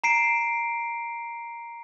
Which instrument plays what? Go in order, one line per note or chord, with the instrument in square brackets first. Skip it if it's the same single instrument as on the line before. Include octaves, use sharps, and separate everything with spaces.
[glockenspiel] A#5 C7 D7